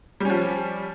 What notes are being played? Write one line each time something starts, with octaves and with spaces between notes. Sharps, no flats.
F3 G3 C#4